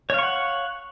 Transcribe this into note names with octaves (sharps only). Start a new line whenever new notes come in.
C#5 F5 F#5 C#6